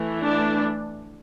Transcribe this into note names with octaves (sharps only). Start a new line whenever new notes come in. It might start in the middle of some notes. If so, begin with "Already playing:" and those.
Already playing: E3 A3
D4